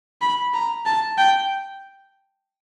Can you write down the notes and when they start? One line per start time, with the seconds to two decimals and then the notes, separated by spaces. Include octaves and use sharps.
0.21 B5
0.54 A#5
0.86 A5
1.18 G5